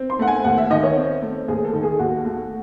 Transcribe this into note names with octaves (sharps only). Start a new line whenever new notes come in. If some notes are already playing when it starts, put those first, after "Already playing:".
Already playing: C4
C6
A3 F#5
G#5
D#2 F#5
E5
D#3 D#5
C#5
C4
A3
D#2 G#4
A4
D#3
G#4
D#2 F#4
A3